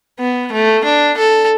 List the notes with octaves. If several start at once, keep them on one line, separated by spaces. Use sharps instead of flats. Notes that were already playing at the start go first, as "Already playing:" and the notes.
B3
A3
D4
A4